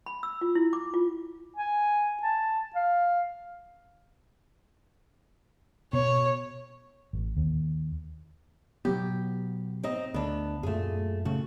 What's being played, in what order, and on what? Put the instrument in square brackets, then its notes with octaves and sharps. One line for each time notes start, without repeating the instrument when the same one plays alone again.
[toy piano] B5
E6
F4
E4
D6
F4
[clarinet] G#5
A5
F5
[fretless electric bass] B2 [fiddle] C#5
[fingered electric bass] A1
D#2
[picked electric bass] B2 F#3 B3 [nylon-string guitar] G4
[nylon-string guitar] C4 D#4 D#5
[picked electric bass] D2 [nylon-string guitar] B3 D4
[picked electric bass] F#2 A#2 [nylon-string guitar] A3 G#4
[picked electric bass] A#2 C#3 A3 [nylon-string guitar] F#4